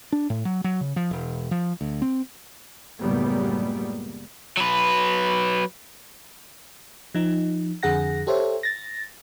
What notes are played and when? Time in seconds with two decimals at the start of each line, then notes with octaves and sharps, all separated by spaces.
0.12 D4
0.30 A2
0.45 F#3
0.64 F#3
0.81 C#3
0.96 F3
1.11 E1
1.51 F3
1.81 D2
2.02 C4
3.00 C#2 F#2 A2 G3 A#3 B3
4.57 F#3 B4
7.14 F3 D#4
7.83 F2 D3 G#4 F#5 A#6
8.27 G4 A4 C5 C#5 E5
8.63 A6 A#6